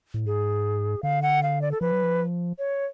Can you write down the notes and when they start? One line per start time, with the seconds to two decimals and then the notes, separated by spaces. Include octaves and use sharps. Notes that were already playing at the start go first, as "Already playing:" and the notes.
0.14 A2
0.26 G#2 G#4
1.03 D3 F5
1.22 F#5
1.43 F5
1.61 D5
1.71 A4
1.81 F3 B4
1.92 F#3
2.03 F3
2.58 C#5